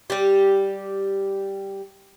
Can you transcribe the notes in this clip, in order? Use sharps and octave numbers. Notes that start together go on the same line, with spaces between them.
G3 G4